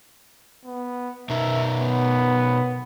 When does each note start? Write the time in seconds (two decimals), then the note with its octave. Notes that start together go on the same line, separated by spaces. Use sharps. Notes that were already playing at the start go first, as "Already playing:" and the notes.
0.65 B3
1.29 B2 D#4 A#4 E5
1.79 B3